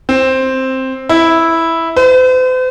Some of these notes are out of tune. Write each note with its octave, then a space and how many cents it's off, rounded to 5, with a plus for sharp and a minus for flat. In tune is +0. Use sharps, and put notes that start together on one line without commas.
C4 +5
E4 -5
C5 -45